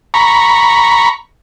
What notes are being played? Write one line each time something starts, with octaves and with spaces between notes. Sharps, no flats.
A#5 B5 C#6